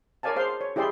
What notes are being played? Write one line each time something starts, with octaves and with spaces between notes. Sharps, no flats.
A#4 C#5 D5 F5 G#5 A5
G#4 C5 F5 C6
C#5
E4 G4 G#4 D5 E5 C6